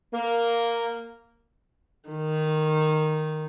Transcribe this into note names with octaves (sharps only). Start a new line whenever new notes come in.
A#3
D#3